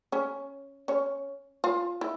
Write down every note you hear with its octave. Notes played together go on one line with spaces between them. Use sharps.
C#4 C#5
C#4 C#5
F4 F5
E4